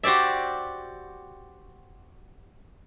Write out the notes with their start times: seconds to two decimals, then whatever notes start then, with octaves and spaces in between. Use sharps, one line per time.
0.03 F#4 G4 C5 D5 E5